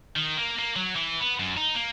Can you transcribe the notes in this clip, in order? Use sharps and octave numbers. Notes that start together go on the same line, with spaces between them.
D#3
A#3
A#3
F#3
E3
B3
F#2
D#4
A#3